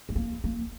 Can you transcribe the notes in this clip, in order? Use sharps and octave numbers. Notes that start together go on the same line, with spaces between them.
A3
A#3
A#3